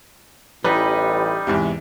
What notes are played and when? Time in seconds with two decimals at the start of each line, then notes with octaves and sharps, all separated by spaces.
0.65 A1 E3 G3 D#4 B4
1.47 E2 G#2 C3